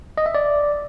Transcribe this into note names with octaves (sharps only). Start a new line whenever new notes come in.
D#5
E5
D5